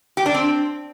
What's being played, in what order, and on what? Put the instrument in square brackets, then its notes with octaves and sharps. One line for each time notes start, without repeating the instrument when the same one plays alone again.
[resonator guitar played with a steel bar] G4
D4
C4